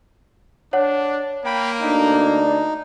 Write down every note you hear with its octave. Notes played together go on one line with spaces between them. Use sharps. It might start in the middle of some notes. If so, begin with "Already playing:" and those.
D4 C#5 F#5
A#3 G5 B5
D2 D4 D#4